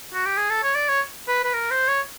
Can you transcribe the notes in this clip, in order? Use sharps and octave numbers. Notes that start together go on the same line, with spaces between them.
F#4
G4
G#4
A4
C#5
D5
C#5
B4
B4
A#4
C5
C#5